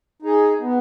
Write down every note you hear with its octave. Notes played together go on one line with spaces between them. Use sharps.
D#4 G#4
B3